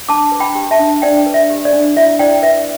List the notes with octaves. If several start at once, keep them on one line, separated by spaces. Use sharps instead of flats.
D4 A5 D6
B4
G5 B5
G4
E5 A5
D4
D4 D5 G5
B4
E5
G4
D5
D4
E4 E5
E4 D5 G5
B4 E5